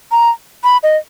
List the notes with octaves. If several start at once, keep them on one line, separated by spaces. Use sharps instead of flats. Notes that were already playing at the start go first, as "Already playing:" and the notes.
A#5
B5
D#5